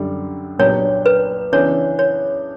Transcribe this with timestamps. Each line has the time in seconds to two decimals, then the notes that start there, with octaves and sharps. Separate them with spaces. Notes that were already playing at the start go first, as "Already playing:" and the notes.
Already playing: F#2 D3 G3
0.59 A#2 F#3 B3 D4 G4 C#5
1.06 B4
1.52 C#3 E3 B3 D4 C#5
1.99 C#5